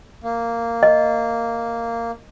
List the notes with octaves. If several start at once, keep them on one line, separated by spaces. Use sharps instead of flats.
A#3
D#5